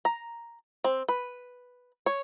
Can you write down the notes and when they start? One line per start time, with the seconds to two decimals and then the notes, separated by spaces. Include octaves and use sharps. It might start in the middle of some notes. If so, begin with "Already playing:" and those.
0.05 A#5
0.84 C4
1.09 B4
2.06 C#5